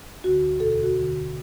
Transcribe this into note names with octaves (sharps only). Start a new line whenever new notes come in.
D2 D3 F#4
E2 B2 A4
A4
F#4
D2
D3